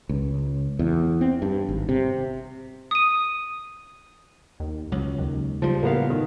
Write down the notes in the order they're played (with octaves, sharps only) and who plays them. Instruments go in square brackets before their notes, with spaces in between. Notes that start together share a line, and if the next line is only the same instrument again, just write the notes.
[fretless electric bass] C#2
E2
C4
G2
G#1
C3
[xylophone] D#6 D#7
[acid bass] D#2
[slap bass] C#2 [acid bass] F#3
[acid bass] D#2
[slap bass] C#3 G3 [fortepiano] F3
[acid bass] A2 [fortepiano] A#3 B3 F5
[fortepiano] D#3